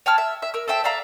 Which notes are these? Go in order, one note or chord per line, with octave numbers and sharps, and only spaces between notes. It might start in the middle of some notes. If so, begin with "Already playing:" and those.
C#5 G5 A5 F6
E5
E5
A#4 E6
A4 C5 E5 G5
D5 E5 F5 A#5